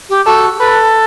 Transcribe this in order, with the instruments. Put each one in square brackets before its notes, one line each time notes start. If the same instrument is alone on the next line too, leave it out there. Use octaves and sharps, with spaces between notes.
[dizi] G4
[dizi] F#4 [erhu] A4
[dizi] G4
[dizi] A4 [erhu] B4